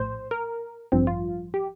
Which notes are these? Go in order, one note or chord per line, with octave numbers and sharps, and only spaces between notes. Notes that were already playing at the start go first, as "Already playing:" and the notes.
Already playing: A#1 A2 C5
A#4
A1 G2 F3 C4
F4
G4